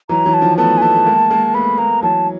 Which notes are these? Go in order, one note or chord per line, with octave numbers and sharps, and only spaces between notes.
E3 F#3 A#5
E3 F#3
A5
D#3 F3
A3 B3 A5
G#5
A3 B3 A5
A3
G#3 A#3
G#3 A#3
A3 B3 B5
G#3 A#3 A#5
E3 F#3 A5